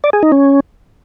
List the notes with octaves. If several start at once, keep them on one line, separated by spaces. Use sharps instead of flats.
D5
G#4
D#4
C#4